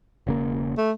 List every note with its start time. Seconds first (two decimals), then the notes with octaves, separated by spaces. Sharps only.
0.27 E1 C#3 A#3
0.77 A3